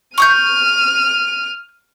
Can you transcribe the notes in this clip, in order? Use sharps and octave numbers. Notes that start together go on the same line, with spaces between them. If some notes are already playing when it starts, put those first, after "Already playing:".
C#6 D#6 F6 G6 D#7